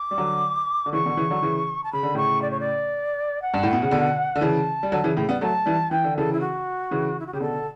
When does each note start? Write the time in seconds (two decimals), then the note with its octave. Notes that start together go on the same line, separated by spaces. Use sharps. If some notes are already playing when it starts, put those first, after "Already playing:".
Already playing: D6
0.11 G3
0.18 D3 F#3
0.86 D3
0.93 C#3 E3 C#6
1.06 B2 D3
1.17 C#3 E3
1.30 D3 F#3
1.42 C#3 E3
1.84 A5
1.93 C#3 B5
2.03 D3
2.15 A2 C#3 C#6
2.42 D5
2.51 C#5
2.60 D5
3.42 F#5
3.54 G2
3.63 A2
3.73 B2
3.82 C#3
3.91 B2 D3
4.36 D3
4.41 C#3 E3 A5
4.83 G3
4.92 D3 F#3
5.04 C#3 E3
5.16 A2 C#3
5.29 G3 B3
5.41 F#3 A3 A5
5.66 E3 G3
5.91 E3 G5
6.04 D3
6.17 C#3 E3 A4
6.33 E4
6.41 F#4
6.91 C#3 E3
7.20 E4
7.26 F#4
7.33 C#3 G4
7.40 B2 D3 A4